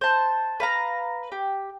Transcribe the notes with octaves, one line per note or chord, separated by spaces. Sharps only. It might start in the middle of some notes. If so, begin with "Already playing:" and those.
C5 A5
B4 F5 A#5
G4